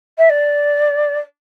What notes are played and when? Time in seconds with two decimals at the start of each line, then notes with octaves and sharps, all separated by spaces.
0.18 E5
0.30 D5